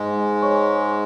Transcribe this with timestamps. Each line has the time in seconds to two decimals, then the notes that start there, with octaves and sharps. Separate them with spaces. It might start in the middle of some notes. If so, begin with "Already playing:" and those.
Already playing: G#2 G#3
0.42 C#5 G#5 C#6